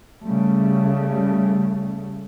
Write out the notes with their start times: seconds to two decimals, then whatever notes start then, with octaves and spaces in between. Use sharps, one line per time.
0.22 C#3 G3 A3